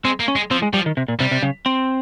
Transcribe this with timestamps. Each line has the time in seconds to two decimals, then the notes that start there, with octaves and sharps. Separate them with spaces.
0.05 G#3 C4
0.20 A#3
0.28 C#4
0.36 G#3
0.51 F3 C4
0.62 G#3
0.73 F3 G3
0.86 D#3
0.97 C3
1.08 A#2
1.19 C3 G3
1.31 C3
1.43 C#3
1.66 C4